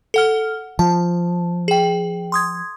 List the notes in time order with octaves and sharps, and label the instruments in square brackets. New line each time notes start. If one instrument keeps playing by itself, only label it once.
[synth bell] A4 F#5 F6
[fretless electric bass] F3 [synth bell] A5
[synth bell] G#4 G5
C6 D#6 G#6